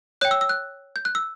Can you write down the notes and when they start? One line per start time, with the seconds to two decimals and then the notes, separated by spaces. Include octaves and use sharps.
0.21 C#5 G5 F#6
0.31 E6
0.41 E6
0.49 F#6
0.96 G6
1.05 F#6
1.15 E6